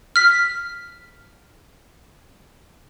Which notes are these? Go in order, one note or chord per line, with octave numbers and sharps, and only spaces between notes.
F6 B6